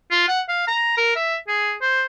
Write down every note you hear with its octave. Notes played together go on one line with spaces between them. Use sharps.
F4
F#5
F5
A#5
A#4
E5
G#4
C5